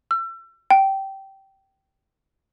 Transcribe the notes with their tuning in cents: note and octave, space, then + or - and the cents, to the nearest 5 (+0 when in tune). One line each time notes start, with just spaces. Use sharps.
E6 +35
G5 -15